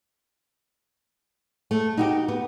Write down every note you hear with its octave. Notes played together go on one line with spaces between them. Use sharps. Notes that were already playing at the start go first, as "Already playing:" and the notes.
A3
D#4 F#4 G4
B3